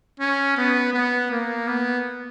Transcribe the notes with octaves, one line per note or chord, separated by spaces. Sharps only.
C#4
B3
B3
A#3
B3